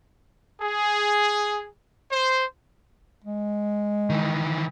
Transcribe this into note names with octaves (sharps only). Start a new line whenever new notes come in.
G#4
C5
G#3
D#3 E3